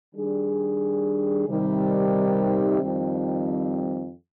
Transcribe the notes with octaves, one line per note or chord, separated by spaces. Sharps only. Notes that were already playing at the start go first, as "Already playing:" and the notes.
D#3 G3 D4 G#4
C3 D#3 G3
F2 D#3 G3 C4